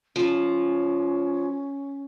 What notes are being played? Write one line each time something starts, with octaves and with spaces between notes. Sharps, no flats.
F3 C#4